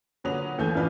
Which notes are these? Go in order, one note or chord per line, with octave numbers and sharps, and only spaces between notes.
A#2 D3 F#3 B4 D#6 F7
D#2 E3 A3 G#5 G6
A1 E3 D4 F4 B4 F6